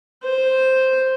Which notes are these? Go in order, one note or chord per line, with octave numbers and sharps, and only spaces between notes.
C5